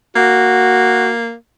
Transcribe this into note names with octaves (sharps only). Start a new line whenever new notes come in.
A#3 F#4